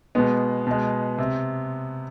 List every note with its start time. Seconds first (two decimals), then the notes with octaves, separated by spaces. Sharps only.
0.15 B2 G#3 B3
0.67 B2 G#3
1.18 C3